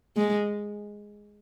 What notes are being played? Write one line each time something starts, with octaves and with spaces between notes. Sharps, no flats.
G#3